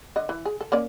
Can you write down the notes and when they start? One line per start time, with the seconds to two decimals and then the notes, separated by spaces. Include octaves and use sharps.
0.16 D3 D#5
0.29 E3
0.45 G#4
0.61 A4
0.72 A#3 C#4 D5